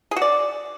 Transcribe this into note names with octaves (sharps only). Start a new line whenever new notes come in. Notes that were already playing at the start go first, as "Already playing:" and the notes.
G#4
F#4
D5